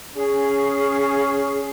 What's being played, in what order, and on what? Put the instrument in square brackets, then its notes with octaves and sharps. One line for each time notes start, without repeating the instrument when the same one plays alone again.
[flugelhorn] C#4 [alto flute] G#4